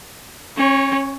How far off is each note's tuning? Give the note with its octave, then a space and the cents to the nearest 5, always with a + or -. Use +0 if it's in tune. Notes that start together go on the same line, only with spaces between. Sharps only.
C#4 -35 C#5 +0